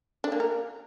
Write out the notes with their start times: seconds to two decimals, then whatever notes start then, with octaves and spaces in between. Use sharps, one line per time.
0.24 D4
0.32 A#3
0.40 A#4